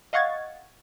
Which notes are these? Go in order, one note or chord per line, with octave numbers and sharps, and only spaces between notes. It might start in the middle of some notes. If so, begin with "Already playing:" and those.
D#5 F5 F#5 C#6 G#6 A6